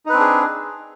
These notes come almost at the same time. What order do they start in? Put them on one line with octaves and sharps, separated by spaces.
D#4 B4 C4 D4 G#4